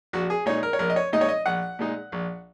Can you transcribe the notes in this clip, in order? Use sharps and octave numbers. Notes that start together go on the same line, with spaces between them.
A#1 F#4
G#4
A#2 G#3 D#4 C#5
A#4
C#5
A#1 A#4
D#5
C#5
A#2 G#3 D#4 D#5
C#5
D#5
A#1 F#5
A#2 G#3 D#4
A#1